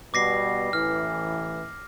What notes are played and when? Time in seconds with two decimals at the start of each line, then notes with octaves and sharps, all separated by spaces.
0.14 B2 G3 B3 D6 A#6 C7
0.73 A1 E3 F6